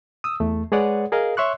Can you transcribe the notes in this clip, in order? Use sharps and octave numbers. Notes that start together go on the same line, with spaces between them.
D#6 E6
E2 A3
G#3 G#4 B4 C#5 D5 F#5
G#4 A#4 D#5 F5
C#5 E5 C6 C#6 F#6